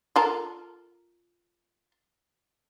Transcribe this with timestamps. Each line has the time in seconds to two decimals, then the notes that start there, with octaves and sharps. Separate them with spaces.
0.16 F4 A4 A#4